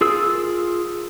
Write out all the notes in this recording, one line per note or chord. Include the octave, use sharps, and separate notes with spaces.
F4 G#4 A#4 E6